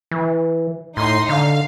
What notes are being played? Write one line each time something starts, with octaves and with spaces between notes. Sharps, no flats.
E3
A2 D#4 C6
D3 F5